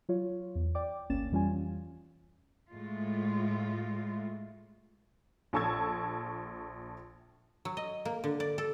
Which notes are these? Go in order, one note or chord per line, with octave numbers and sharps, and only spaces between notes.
F#3 F4 C#5
E2
D5 G5 D6
G1 D2 A#3 C#4 A6 E7
F2 E3 G3 C#4 F4 G#5
A2 G#3 A3 F4
A#1 A4 A5 C#6 E6 G#6
F#3
D#5
A#3
D3
D5
A4